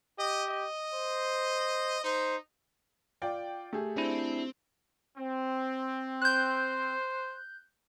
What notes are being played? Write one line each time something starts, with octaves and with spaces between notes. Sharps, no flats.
G4 D#5
D#5
C5
D#4 C5
F4 D5 G5
A3 G4 G#4
C4 D4 E4
C4
C5 F#6 G6